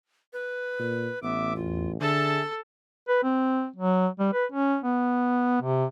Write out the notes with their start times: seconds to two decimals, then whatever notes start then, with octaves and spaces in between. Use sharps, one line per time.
0.33 B4
0.79 A#2
1.23 A1 B3 E5 D6
1.55 E2 F4
2.01 D3 G#4 A4 E5 A5
3.08 B4
3.23 C4
3.76 F#3
4.19 G3
4.33 B4
4.52 C#4
4.84 B3
5.62 C3